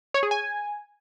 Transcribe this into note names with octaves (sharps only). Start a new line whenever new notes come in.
C#5
G#4
G#5